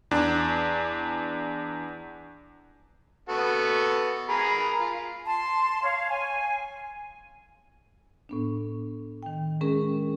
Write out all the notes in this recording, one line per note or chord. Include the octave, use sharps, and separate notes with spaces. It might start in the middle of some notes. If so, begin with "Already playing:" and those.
E2 D4
B3 F#4 A4
G#4 A#4 B5
F4
A5 C6
C#5 F5
G#5
A2 B3 D4
D#3 G5
G#3 C#4 G#4 A#4